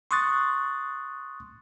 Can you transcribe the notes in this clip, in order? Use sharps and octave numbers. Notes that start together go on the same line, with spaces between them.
C6 C#6 D#6 F#6 A6